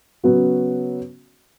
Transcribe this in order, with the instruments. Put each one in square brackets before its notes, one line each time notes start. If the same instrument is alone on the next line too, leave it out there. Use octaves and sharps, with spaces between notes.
[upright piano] C#3 F#3 B3 F#4